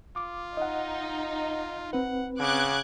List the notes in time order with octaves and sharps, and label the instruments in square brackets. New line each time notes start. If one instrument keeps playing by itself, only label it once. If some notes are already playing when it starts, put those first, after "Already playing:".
[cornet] F4 [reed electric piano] D6
[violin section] D#4 [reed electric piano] D#5 F#5
[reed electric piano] C4 B4 [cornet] F#5
[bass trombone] C#3 [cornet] F#5 [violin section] D6 F#6 G#6